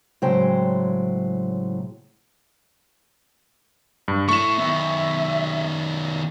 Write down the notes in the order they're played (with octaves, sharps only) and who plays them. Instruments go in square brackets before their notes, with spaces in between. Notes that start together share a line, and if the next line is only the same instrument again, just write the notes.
[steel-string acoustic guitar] A2 C#3 F#3 G#3 C5 G5
[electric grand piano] G2
[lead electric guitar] A3 E4 [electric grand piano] C#6 E7
[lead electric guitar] D#3 B3 [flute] E5